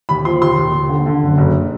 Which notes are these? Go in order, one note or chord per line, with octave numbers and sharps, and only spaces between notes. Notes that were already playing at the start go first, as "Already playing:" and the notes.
D#2 B5
F3 C6
D#2 C6
D#2
D#2
D3
D3
F#1
F#1